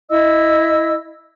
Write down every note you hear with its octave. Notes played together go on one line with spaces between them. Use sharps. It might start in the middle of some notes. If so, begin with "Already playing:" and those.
E4 D#5 E6